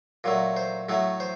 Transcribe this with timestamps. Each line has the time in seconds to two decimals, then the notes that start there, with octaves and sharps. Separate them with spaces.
0.24 A#2 F#3 A3
0.57 C5
0.89 A2 F#3 A3
1.20 C5